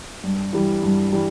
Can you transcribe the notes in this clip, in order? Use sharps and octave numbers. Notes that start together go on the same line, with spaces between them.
G2
E3 G3
G2
E3 G3